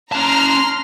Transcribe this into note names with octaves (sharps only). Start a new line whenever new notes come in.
C#4 A5 A#5 C6 F6